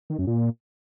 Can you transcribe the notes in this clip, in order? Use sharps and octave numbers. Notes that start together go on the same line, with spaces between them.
D#3
F#2
A#2